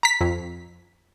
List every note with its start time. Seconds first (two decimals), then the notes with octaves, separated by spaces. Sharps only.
0.03 A#5 B6
0.21 F2